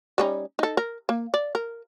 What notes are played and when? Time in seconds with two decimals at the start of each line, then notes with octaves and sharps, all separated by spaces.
0.18 G3 C#4 D#4
0.59 D#4 A4
0.77 A#4
1.09 A#3
1.34 D5
1.55 A#4